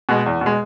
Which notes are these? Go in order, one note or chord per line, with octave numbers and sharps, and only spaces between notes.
B2 G#3
E2
B2
G#3